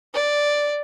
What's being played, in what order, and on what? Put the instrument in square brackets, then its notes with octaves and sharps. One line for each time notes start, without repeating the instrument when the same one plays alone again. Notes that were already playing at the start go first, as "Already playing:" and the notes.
[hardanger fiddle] D5